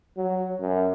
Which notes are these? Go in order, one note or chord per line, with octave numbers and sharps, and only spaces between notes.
F#3
F#2